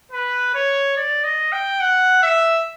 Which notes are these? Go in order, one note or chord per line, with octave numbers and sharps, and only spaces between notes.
B4
C#5
D5
D#5
G5
F#5
E5